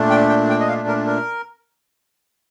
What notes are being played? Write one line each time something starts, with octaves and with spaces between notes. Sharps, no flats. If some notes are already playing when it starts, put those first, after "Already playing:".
Already playing: A#2 A3 D4
G5
G5
G5
D#5
F5
A#4
A#4